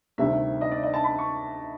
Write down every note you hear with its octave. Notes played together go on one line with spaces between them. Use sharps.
D2 C3 D#3 G3 E5
D#5
D5
D#5
A5
B5
C#6